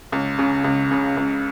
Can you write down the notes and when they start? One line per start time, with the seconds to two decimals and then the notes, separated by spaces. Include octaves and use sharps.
0.12 C#2
0.38 C#3
0.64 C#2
0.91 C#3
1.17 C#2